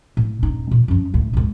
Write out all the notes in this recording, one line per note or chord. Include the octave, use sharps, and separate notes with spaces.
A2
D#1 D#4
A#2
F#2 F3
D2 A2
D2 G#2